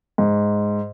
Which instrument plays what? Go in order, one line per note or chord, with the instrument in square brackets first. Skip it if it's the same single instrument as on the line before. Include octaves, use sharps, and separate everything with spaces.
[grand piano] G#2